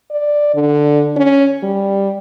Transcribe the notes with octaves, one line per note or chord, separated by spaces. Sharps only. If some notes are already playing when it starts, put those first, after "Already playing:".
D5
D3
C#4
G3